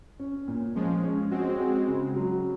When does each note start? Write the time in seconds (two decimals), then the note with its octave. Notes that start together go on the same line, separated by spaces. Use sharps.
0.19 C#4
0.48 A#2
0.75 F3 G#3 C#4
1.04 C#4
1.31 G#3 C4 F#4
1.59 F#4
1.87 C#3
2.16 F#3